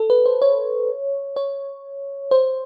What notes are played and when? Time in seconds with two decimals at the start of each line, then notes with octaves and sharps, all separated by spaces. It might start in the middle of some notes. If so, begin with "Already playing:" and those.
Already playing: A4
0.10 B4
0.26 C5
0.42 C#5
1.36 C#5
2.31 C5